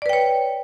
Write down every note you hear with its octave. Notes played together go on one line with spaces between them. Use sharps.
B4 C#5 D5 G5